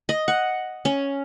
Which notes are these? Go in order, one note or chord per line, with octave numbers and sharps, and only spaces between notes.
D#5
F#5
C#4